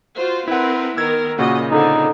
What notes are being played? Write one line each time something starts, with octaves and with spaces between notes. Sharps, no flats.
F4 F#4 C5
C4 E4 A#4 B4 F#5
D#3 B3 A#4 E6 G#6
A#2 C#3 A#3 F#4 D#5
D3 C4 D#4